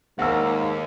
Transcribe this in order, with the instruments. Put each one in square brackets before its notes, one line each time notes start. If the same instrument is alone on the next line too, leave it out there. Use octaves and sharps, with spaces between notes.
[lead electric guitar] D#2 [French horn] G#2 [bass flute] A#3 [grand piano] F#5 E6